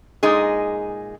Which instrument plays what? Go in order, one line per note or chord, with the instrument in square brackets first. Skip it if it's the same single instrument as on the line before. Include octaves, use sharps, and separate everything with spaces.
[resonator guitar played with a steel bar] A#2 G#3 D#4 G#4